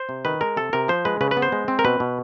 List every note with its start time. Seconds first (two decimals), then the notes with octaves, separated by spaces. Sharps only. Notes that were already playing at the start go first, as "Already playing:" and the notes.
Already playing: C5
0.09 C3
0.25 D#3 B4
0.41 G#3 A#4
0.56 C3 A4
0.73 C3 A#4
0.88 F3 C5
1.05 G#3 B4
1.21 C#3 B4
1.31 B4
1.37 B3
1.42 C5
1.52 G#3
1.68 C4
1.79 A#4
1.85 B2 B4
2.00 B2